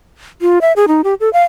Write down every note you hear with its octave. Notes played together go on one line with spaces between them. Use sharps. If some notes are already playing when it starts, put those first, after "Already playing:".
F4
E5
G#4
D#4
G4
A4
F5